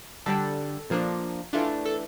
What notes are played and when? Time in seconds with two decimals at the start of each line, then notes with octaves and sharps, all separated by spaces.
0.26 D3 G3 D4 A4
0.90 A#2 F3 A#3 D4
1.53 E3 A3 D4 F4
1.85 A4